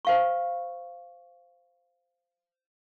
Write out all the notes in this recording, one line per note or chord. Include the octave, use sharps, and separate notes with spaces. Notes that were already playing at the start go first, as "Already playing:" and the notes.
C5 F5 C#6